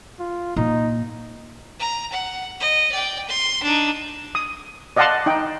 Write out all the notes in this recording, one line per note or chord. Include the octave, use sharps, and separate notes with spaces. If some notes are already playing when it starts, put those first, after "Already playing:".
F4
A#2 D#4
A#5
F#5
D#5
D5 G5
C6
D4 D#4
D#6
D5 D#5 F5 F#5 A5 C6
D#4 D#5 G5